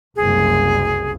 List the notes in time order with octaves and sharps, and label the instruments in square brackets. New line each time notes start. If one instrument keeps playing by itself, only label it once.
[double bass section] F#1 C2 [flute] G#4